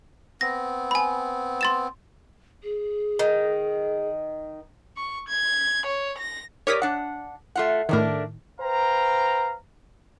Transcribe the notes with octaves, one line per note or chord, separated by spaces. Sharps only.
B3 C4 A#6
G#5 B5
C6 A6 E7
G#4
D#3
C#6
G#6
C#5
A#6
G4 A#4 C#5 D5 D#6 B6
D4 F#5
A3 F4 F#5
A2 D#3 A3 D4 A#4
B4 C5 F5 G5 A#5